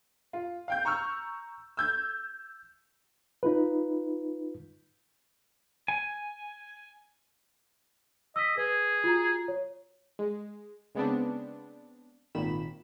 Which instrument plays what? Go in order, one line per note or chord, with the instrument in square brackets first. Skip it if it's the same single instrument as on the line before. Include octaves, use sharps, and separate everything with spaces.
[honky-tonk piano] F4
F5 G5 G6
A#5 C#6 E6 F6
E6 G6 G#6
[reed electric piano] D#4 F4 B4
[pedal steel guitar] G#5
[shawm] D#5 [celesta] E6 B6
[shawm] G#4 [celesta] B4
[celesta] F4 F#4 A#5
C#5
[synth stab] G#3
C#3 G#3 B3 C4 D4
G#1 A#2 D#3 B5 E7